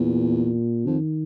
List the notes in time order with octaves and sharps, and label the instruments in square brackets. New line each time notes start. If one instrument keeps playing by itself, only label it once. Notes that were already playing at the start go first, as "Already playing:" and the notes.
Already playing: [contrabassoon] E2 [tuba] A#2
[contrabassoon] F2 [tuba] D#3